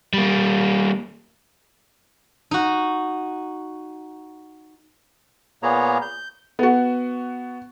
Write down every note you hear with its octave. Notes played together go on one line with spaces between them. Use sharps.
G3 A#3
D#4 F#4
A#2 A#3 B3 G#4 C#5 A#5
G6
B3 F#4